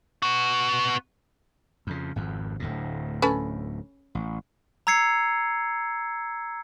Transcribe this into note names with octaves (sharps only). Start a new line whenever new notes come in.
B3 F#4
F2 C#3
G#1 F2
D1 D2 A2
C#4 A4 B4
A1
A#5 E6 G#6 C7 C#7